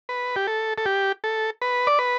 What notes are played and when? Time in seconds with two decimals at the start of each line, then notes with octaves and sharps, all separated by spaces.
0.09 B4
0.36 G4
0.47 A4
0.78 A4
0.86 G4
1.24 A4
1.62 B4
1.87 D5
1.99 B4